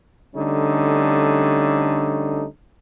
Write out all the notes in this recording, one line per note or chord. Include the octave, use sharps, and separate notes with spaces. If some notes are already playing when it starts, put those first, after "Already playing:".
D3 G3 A3 C#4 D#4